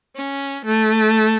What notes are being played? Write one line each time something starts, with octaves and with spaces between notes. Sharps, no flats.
C#4
A3